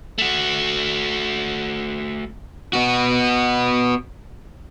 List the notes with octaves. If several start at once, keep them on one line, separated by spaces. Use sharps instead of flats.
A3 F#4
B3 F#4